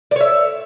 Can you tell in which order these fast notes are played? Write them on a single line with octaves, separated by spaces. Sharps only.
D5 C#5 E5